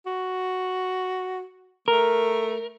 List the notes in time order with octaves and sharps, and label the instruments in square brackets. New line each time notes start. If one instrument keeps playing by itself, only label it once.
[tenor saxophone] F#4
[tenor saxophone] A3 [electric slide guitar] A#4